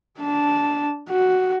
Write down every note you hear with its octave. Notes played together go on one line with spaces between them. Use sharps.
D4 A5
F#4